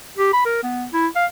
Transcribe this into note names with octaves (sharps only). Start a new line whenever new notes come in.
G4
B5
A#4
B3
E4
F5